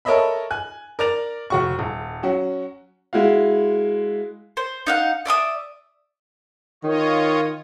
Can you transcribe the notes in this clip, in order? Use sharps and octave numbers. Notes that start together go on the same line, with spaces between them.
A4 A#4 C#5 D#5 E5 B5
G#5 F#6
A#4 D5 A6 F7
F1 F#4 C#6
D#1
F#3 C#4 F#4
G#3 E4 F#4 F5
C5
D#4 F5 F#5
D5 E5 D6 D#6
D#3 F4 C#5 D#5